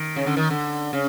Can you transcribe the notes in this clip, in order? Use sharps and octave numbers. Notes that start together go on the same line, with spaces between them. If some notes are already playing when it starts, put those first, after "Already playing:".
Already playing: D#3
C#3
D3
D#3
D3
C#3